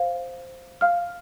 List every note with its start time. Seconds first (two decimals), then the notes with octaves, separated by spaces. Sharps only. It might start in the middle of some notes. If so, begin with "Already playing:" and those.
Already playing: C5 F5
0.81 F5 F6